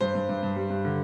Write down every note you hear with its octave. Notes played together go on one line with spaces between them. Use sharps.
G2 C5
G2
G2
G2
G3
G2
D3